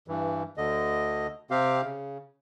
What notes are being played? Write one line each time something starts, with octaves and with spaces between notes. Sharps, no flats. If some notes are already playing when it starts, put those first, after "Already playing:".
G2 E3
D2 D3 D#5
C3 C4 G4 F5
C#3